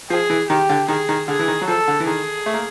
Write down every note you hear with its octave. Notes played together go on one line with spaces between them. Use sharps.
F3 G#4
E3
D#3 G4
D3
D#3 G#4
D#3
D3 G#4
E3
D#3
F#3
F3 A4
D3
E3
D#3 G#4
A3
A#3